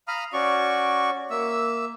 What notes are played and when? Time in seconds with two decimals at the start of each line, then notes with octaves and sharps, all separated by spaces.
0.08 F5 A#5 B5 D#6 F6
0.33 C#4 F#4 D5 C#6
1.30 A#3 E5 E6